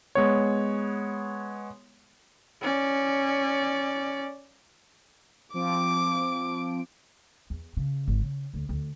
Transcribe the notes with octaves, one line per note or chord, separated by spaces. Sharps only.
G#3 B3 C#5
C#4 D5
F3 C4 D6 D7
E2
C#3
G#1
C#3
D2
D2